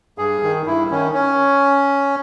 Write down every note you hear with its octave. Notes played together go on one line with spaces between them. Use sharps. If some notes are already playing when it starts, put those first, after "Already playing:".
G2 G#4
D#3
G2 E4
D#3 C#4
C#4